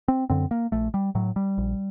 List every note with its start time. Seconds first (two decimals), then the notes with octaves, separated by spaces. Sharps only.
0.08 C4
0.30 F#2 D3 C4
0.51 A#3
0.72 A#1 A3
0.94 G3
1.15 A2 F#3
1.36 G3
1.58 A#1